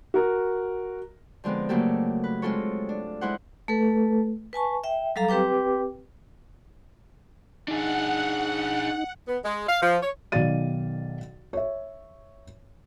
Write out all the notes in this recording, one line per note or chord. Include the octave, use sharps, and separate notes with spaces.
F#4 A#4
D3 F3 G#3 B3 C4
C#3 F#3 A3 A#3 G4 A4
B4
G#3 C4 F4 A4 C#5
D4
G#3 E4 C5 F#5
A3 A4 B4
B4 G#5 A5 C#6
E5 G5
F#3 G3 A4 F5 A#5
C4 G4 B4 G5 D6
D4 D#4 G#4 F#5
B3
G#3
F5
F3
C#5
B1 D#3 D5 F5 A6 D#7
C#5 E5